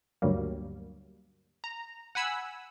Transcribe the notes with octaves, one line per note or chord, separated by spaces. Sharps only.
D2 G2 F#3 G3 A#3
A#5
F#5 G#5 B5 E6